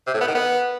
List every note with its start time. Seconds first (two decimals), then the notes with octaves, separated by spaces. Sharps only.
0.07 C3
0.14 A2
0.21 B3
0.28 D#3
0.35 B3